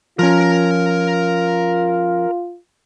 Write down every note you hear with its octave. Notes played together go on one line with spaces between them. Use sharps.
F3 C#4 F4 A#4 A#5